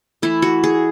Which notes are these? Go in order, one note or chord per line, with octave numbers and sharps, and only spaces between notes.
E3 A3 E4
F#4
G#4